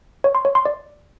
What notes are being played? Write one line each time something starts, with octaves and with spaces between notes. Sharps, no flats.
C#5
C6
C#5
C6
D5